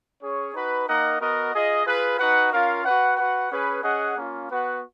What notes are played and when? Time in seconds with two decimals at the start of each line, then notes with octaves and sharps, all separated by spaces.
0.22 C#4 G#4 C#5
0.54 D#4 F#4 B4
0.87 A#3 D#4 A#4 D#5 F#5
1.20 B3 F#4 A#4 D#5 F#5
1.53 F4 G#4 D#5
1.85 F4 G#4 B4
2.19 D#4 F#4 B4 F#5
2.52 C#4 F4 A#4 F5
2.85 F#4 B4 F#5
3.17 F#4 B4 F#5
3.51 C#4 G#4 B4
3.83 C#4 G#4 D#5 F#5
4.16 A#3 C#4 F4
4.49 B3 F#4 B4 F#5